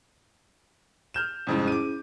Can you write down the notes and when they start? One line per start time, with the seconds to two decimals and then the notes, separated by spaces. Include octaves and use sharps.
1.14 F6 G6 E7
1.47 C2 F2 G#2 C#4 E4 G#4
1.68 D6 D#7